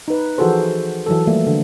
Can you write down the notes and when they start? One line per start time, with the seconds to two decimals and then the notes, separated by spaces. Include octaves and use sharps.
0.08 D#4 B4
0.38 E3 F3 F#4 G#4 A4 C5
1.06 E3 F#3 A4
1.27 F3 G3 A3 A#3
1.47 D3